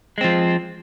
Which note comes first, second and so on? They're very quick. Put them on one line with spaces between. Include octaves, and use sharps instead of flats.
G#3 C4 F3